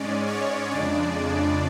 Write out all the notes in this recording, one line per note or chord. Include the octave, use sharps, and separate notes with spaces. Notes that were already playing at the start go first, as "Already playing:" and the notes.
Already playing: G#2 G#3 C#4 D5
C#5
F2 C#3 G#3 D4 D5